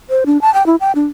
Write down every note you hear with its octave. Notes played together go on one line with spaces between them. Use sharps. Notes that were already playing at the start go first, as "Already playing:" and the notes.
C5
D4
A5
G5
E4
G5
D4